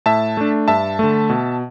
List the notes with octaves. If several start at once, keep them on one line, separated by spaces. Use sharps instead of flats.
A2 E5 A5
A3 D4
G2 E5 A5
D3 A3
B2